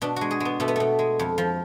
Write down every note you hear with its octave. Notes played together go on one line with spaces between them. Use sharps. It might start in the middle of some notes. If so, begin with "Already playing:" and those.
B2 D4
G#3 F#4
G#4
G#3 B3
B2 A3
B3
B2 A3
G#3
F2
F3